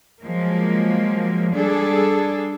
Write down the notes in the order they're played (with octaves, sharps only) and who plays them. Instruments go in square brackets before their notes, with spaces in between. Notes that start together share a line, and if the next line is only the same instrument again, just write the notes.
[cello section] F3 F#3 G#3 A#3
G3 D4 G#4 A4